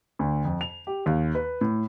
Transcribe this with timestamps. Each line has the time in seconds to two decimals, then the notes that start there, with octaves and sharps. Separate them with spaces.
0.19 D2
0.45 F2
0.61 F7
0.87 G4
1.06 D#2
1.35 B4
1.61 A2